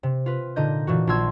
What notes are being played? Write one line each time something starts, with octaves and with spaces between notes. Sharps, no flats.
C3
F4 B4
A#2 D3 D#4 D#5 G6
A#2 E3 F#4
A#1 F4 C6 E6 G#6